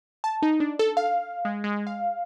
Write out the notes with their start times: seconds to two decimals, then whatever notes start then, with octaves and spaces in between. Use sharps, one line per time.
0.24 A5
0.42 D#4
0.60 D4
0.79 A4
0.97 F5
1.45 G#3
1.64 G#3
1.87 F5